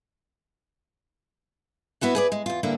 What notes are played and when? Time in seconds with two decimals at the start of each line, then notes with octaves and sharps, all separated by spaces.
2.01 B3 E4 F#4 F#5
2.15 G#4 B4 D5
2.32 G#3
2.46 E2 F4
2.63 G2 D3 A#3 E4